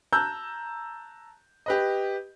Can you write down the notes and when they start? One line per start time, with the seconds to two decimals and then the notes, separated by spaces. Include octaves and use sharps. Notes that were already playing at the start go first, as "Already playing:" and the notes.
0.13 A5 A#5 E6 F#6 G6
1.66 G4 B4 D#5